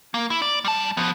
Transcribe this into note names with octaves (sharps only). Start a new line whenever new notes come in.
A#3
E4
D5
G3 A5
F3 B3